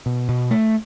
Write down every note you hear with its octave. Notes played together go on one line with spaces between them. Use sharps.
B2
B2
A3